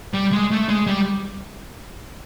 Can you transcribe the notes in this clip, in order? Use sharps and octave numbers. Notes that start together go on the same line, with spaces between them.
G3
G#3
A3
G#3
G3